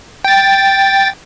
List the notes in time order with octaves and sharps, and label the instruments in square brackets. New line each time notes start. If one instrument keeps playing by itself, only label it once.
[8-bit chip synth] G5 A6